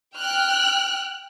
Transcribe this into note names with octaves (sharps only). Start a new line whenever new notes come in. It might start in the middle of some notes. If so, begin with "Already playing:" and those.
G5 F6 F#6